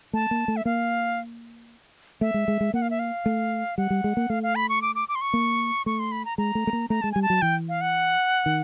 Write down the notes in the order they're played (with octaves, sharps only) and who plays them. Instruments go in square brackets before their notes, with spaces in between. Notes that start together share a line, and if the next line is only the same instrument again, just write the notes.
[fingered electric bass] A3 [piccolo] A5
[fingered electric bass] A#3
A3
[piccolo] E5
[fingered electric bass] A#3 [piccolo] F5
[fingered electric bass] A3 [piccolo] E5
[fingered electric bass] G#3
G#3
G#3
[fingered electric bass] A#3 [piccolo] F#5
[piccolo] F5
E5
F5
[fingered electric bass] A3
[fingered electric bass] G3 [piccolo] F#5
[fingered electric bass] G3
G#3
A#3
[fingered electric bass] A3 [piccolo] F5
[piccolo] F5
B5
C#6
D6
D6
D6
C6
C#6
[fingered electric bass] A#3
[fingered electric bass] A3 [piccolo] C#6
[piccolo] C6
B5
A#5
[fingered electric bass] G#3 [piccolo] A#5
[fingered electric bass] A3
A3
A#3
[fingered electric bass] A3 [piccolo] A#5
[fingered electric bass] G#3 [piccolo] A5
[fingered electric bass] G3 [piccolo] G#5
[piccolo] A5
[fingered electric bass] F#3
[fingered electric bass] E3 [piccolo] G5
[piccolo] F5
F#5
[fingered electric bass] D#3